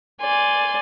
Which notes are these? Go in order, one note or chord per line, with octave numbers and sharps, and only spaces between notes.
D5 G#5 C6